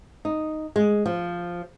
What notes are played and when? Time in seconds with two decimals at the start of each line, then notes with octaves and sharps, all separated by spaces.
0.25 D#4
0.76 G#3
1.06 F3